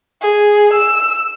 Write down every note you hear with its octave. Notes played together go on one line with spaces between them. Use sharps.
G#4
E6